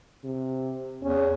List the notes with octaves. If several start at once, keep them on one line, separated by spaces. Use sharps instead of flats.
C3
E2 C#4